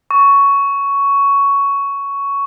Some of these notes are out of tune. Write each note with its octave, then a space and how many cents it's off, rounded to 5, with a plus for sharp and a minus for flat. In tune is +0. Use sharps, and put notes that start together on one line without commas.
C#6 +10